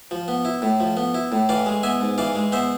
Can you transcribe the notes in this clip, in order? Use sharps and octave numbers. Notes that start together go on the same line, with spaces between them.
F3
B3
E4
A2
F3
B3
E4
A2
E3 D5 F5
G#3
B3 E5 G#5
G#2
E3 D5 F5
G#3
B3 C5 E5